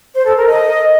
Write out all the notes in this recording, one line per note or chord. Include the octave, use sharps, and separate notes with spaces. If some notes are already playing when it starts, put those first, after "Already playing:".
C5
A4
A#4
D#5